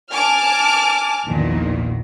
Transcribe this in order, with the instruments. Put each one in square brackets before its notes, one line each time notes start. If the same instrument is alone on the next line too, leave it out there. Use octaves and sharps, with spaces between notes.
[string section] G#5 A5 D6 F6
A#1 E2 A#2 D#3